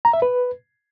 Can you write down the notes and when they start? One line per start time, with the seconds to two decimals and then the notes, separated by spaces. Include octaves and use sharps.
0.05 A#5
0.13 E5
0.22 B4